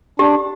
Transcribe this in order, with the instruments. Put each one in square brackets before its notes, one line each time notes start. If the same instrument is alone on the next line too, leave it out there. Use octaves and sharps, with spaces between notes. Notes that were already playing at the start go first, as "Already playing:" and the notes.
[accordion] D4 [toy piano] G4